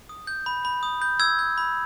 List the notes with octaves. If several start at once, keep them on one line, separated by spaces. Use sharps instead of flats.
D#6
G6
B5
B5
D#6
G6
E6 G#6
G6
B5